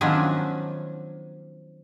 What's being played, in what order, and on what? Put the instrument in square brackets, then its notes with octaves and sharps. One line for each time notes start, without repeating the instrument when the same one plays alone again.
[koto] D#3 F3 F#3 B3 C#4 D4